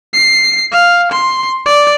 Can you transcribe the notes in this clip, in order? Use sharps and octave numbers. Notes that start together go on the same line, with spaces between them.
C7
F5
C6
D5